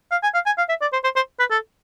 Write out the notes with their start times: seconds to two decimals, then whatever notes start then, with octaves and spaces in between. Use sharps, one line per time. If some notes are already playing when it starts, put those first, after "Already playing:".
0.11 F5
0.23 G#5
0.34 F5
0.46 G#5
0.58 F5
0.69 E5
0.81 D5
0.93 C5
1.04 C5
1.16 C5
1.39 B4
1.51 A4